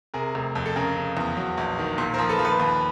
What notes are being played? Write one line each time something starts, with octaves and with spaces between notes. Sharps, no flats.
C3 G#4 A#4
F1
F2
A4
C#3 G#4 A#4
C#3
E2
F#3
A#1
D#3
A#2
F3 A#4 C5
A4 B4
F3
A4 B4
D#2